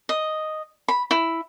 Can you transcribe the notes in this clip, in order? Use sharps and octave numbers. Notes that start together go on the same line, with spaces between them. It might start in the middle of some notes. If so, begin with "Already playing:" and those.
D#5
B5
E4